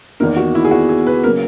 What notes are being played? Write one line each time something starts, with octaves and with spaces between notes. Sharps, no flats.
E2 D#3 A#3 D#4 A#4
F#4
E4
G#4
F#4
G#4
B4
C#3 F#3 A#3 A#4